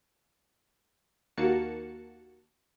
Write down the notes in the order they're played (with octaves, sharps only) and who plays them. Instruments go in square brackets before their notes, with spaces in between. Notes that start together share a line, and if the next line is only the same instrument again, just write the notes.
[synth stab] D#2 A#3 F#4 A5 C#7